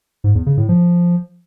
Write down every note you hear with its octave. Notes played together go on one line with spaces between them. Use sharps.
G#2
E2
C#3
A2
F3